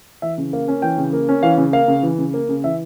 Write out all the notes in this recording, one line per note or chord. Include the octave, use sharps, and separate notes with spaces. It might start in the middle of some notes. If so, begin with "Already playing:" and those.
E3 E5
C#3
A#3 F5
C#4
E3 G5
C#3
A#3
C#4
E3 F5
C#3
A#3 F5
C#3
E3
C#3
A#3
C#3
E3 E5